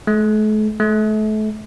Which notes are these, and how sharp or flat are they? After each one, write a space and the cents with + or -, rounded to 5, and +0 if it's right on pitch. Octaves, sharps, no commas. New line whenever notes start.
A3 -45
A3 -35